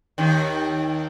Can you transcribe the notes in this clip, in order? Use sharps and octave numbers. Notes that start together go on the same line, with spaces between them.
D#2 D#3